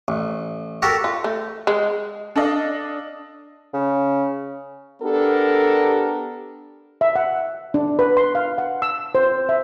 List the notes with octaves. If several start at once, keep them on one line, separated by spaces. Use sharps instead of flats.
A1
F#4 G4 A4 A#4
F4
A3
G#3
D4 A4 D5 D#5 F5
C#3
B3 D4 G4 A4 A#4
E5
F#5
D4
B4
C6
F5
F#5
E6
C5
E5